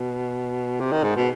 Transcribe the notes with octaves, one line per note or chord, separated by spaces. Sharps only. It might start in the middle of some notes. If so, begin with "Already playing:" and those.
Already playing: B2
C3
D#3
G#2
B2